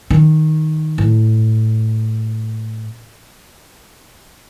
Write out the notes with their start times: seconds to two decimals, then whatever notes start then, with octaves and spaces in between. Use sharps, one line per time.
0.10 D#3
0.98 A2